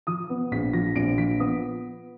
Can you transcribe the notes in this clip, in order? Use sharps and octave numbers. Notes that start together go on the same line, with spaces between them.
F3 D#6
B3
A#1 B6
F3 A#6
A#1 D7
F3 B6
B3 D#6